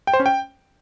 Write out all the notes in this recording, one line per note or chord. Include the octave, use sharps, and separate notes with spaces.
G5
C5
C#4
G5